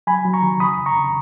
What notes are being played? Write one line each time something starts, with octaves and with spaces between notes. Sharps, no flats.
F#3 G#5 B5
F#3
A#5 C#6
D#3
C#3 B5 D#6
F2
A#5 C#6
C#3